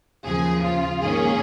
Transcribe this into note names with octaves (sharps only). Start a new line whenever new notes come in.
D#2 C#3 F3 G#4
F4
G#2 D#3 A#3 C#4 G#4